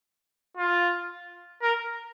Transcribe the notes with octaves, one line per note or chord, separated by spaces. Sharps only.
F4
A#4